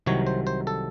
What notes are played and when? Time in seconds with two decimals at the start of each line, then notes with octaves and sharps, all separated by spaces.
0.06 C2 C3 D#3 F#3 C#5
0.27 C5
0.47 C5
0.67 A4